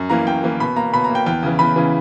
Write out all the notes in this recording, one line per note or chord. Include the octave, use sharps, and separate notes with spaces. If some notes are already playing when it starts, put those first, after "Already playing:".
Already playing: F#2
E3 A#3 A#5
F#2 G5
E3 A#3
B2 B5
A#3 A#5
B2 B5
A#5
A#3
G5
E2 G5
C#3 E3
E2 B5
C#3 E3